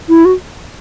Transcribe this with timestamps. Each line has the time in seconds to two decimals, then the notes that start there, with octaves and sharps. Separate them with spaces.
0.09 E4
0.25 F#4